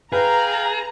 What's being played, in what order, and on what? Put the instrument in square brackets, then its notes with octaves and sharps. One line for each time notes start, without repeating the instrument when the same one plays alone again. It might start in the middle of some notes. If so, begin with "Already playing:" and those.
[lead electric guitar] G#4 [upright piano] B4 [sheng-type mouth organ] F5 G5 [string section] A#5